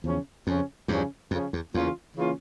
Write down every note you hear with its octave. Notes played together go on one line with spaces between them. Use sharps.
E2 C#3 F3 C#4
F2 C#3 F3 C#4
E2 G2 C#3 F3 C#4
F2 C#3 F3 C#4
E2
E2 C#3 E3 A#3 C#4 F4
C#3 E3 A#3 C#4 F4